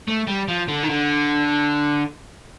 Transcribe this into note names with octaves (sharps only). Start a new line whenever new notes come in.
A3
G3
F3
D3
D#3
D3